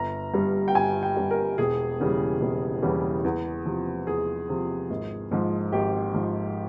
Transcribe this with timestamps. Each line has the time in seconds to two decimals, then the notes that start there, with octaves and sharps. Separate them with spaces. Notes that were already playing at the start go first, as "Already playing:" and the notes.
Already playing: G1 A#5
0.34 G2 G3
0.68 G5
0.75 G1 G#5
1.03 G5
1.17 G2 G3
1.31 A#4
1.58 E1 G#4
2.00 E2 C#3 E3 G3
2.41 E1
2.82 E2 C#3 E3 G3
3.24 E2
3.66 C3 F3
4.07 E2 G#4
4.49 C3 F3
4.90 G#1
5.31 G#2 F3
5.73 G#1 G4
6.14 G#2 F3